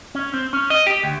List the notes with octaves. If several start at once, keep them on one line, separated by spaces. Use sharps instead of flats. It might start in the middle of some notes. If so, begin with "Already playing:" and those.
C#4
C4
C#4
D#5
G4
D2